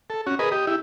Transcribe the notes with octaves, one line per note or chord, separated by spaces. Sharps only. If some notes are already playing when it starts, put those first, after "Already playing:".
A4
C#4 F#4
G#4 A#4 B4 D#5
G4 D#5
E4 G4